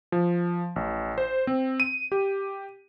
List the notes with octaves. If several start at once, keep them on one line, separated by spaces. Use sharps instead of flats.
F3
A1
C5
C4
D#7
G4